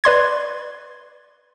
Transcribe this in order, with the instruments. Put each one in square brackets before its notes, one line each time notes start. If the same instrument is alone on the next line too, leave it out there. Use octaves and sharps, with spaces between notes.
[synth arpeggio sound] B4 D5 C6 G#6